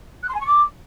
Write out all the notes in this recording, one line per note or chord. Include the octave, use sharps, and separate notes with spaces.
F#6
C6
G#5
C#6
D6